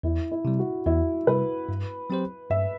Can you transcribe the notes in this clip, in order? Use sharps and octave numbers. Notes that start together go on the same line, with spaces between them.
E2 E4
E4
C3 G3
F#4
E2 E4
C3 G3 B4
G2
F#3 C4 G4 C5
G2 E5